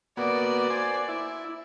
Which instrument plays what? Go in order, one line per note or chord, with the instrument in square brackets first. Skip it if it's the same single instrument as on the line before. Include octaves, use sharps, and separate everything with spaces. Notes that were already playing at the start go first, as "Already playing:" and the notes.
[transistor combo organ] A#3 B3 F#4 [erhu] D5
[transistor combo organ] C5 G#5
E4